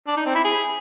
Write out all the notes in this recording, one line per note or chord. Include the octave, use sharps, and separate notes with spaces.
D4
D#4
C4
E4
G#4